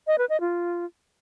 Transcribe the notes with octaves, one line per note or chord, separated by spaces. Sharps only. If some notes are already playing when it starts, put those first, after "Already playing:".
D#5
B4
D#5
F4